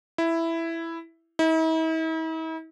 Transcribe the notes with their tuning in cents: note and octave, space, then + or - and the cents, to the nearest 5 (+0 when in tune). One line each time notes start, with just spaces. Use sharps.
E4 +5
E4 -45